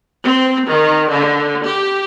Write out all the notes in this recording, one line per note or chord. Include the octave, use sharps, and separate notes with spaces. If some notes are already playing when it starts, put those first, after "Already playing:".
C4
D#3
D3
G4